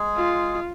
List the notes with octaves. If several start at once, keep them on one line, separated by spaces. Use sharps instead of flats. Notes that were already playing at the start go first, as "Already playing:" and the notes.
Already playing: G#3 G#4
F4